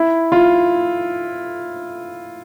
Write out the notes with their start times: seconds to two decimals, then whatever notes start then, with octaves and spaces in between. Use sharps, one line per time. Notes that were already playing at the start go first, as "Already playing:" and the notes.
Already playing: E4
0.32 F4